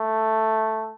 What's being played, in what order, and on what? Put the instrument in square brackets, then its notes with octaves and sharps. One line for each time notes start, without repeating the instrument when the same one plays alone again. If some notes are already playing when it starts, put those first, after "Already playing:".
Already playing: [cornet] A3